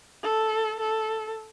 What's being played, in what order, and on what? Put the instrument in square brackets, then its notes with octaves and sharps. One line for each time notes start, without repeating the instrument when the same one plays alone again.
[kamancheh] A4
A4